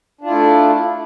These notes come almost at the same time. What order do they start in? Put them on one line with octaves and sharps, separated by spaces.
D4 F4 E4 A3